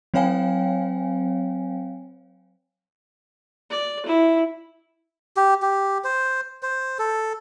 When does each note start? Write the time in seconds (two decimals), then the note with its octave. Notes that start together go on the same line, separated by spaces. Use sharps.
0.14 F#3 C4 C#5 F5 G5 G#5
3.70 D5
4.06 E4
5.37 G4
5.62 G4
6.04 C5
6.63 C5
6.99 A4